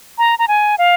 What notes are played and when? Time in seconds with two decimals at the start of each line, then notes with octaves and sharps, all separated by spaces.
0.18 A#5
0.39 A#5
0.48 G#5
0.78 F5